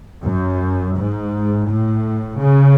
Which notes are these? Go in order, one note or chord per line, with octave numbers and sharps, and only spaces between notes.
F#2
G#2
A2
C#3